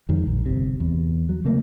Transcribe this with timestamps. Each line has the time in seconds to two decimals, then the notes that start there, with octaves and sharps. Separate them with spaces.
0.09 F2 D#3 G#3
0.27 A#1
0.46 G1 C3
0.80 E2
1.29 F#3
1.45 C#3 A3 A#3